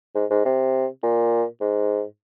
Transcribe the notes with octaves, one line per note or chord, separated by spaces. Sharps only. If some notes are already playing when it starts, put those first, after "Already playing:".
G#2
G#2
C3
A#2
G#2